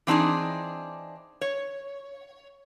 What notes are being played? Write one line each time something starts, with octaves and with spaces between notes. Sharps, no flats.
E3 C4 D4 D#4 G#4
C#5